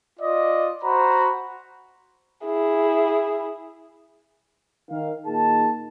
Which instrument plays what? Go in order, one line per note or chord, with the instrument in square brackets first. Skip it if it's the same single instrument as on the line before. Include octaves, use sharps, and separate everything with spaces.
[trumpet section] F4 D5 D#5
F#4 C5 A#5 B5
[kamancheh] E4 G#4
[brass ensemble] D#3 F5
A#2 D#3 G#4 A5